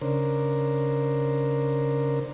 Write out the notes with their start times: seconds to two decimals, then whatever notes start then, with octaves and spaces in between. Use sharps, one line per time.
0.01 C#3 D4 A#4 C5